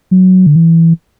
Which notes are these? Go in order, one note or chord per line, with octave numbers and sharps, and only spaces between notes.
F#3
D3
E3